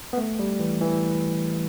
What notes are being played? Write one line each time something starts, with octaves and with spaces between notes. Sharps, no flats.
B3
A3
G3
E3
E3